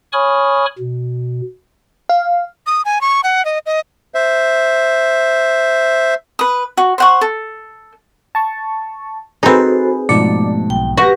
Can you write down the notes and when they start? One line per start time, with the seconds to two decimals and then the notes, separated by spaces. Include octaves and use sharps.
0.13 C#5 G#5 B5 C#6 D#6 F6
0.79 B2
2.09 F5
2.66 D#6
2.85 G#5
3.01 C#6
3.23 F#5
3.45 D#5
3.66 D#5
4.14 C5 E5
6.39 B4 D#6
6.77 F#4
6.98 C5 F#5 C#6
7.21 A4
8.35 A5 C#6
9.43 C4 D#4 F#4 G#4 A4 B4 C5
10.09 G#2 B2 F3 A3 D5
10.70 B1 G5
10.97 F#4 G4 B4 A#6